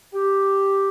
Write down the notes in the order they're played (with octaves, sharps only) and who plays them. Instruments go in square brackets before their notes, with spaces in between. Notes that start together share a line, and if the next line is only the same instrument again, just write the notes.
[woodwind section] G4